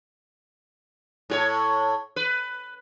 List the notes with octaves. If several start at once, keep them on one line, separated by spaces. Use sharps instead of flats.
A2 G4 C#5
B4